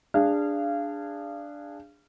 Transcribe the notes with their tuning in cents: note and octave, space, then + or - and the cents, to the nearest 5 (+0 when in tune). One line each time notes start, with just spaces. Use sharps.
D4 +0 G#4 -20 F5 -25